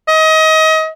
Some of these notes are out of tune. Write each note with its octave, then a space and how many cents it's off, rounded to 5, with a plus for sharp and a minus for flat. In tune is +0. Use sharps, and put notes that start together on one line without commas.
D#5 +30